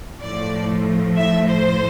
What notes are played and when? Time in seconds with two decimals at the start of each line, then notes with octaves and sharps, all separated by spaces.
0.22 A2 F3 A3 D5
1.16 E5
1.47 C5